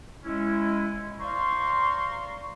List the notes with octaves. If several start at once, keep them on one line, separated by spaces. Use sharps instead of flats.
G#3 C#4 E4
C5 D5 F5 A#5 C6 C#6